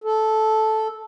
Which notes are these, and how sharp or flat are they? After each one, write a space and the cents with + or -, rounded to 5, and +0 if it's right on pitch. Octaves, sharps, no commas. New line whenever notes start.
A4 -10